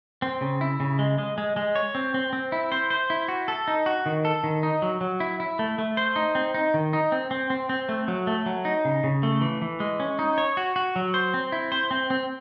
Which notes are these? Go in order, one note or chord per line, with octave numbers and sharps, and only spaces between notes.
C4
C#3
E4
C#3
G#3
G#3
G#3
G#3
C#5
C4
C4
C4
E4
C5
C5
E4
F#4
A4
D#4
F#4
D#3
A4
D#3
D#4
F#3
F#3
E4
E4
A3
A3
C5
D#4
C4
D#4
D#3
D#4
C4
C4
C4
C4
A3
F#3
A3
F#3
D#4
C#3
C#3
A3
E3
E3
G#3
C#4
D#4
C#5
F#4
F#4
F#3
C5
C4
E4
C5
C4
C4